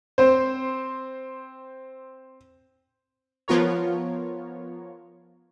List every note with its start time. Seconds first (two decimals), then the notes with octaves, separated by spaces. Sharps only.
0.18 C4 C5
3.48 F3 B3 F4 A#4 C#5